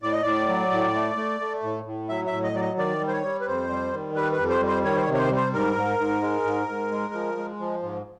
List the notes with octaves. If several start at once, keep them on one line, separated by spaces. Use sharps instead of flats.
A2 D5
D#5
A2 D5
F#3
A2
A3
A3
A3
A2
A2
F#3 E5
E5
A2
D#5
F#3 D5
D#5
D#3 D5
G3
C5
C#5
G3
B4
F2 C5
G3
D#3
G3 B4
B4
F2
C5
G3
C5
D#3 C#5
C5
C#5
C3
C#5
C5
G3
C5
G#2 A#4
G#2
G#2
G#3
G#2
G#2
G#3
F3
G#3
F3
G#2